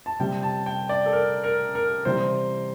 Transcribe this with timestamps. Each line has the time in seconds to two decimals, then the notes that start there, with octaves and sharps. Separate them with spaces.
0.06 A5
0.19 C3 G3 G5
0.43 A5
0.66 G5
0.89 D5
1.06 A4
1.13 A#4
1.44 A#4
1.75 A#4
2.05 C3 E3 G3 C5